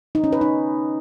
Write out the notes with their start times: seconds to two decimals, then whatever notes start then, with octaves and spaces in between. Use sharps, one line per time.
0.15 D#4
0.24 C#4
0.32 B4
0.41 D#4